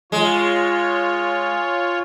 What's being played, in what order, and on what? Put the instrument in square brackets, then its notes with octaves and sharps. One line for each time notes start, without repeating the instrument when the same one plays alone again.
[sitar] G#3 [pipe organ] F4 C#5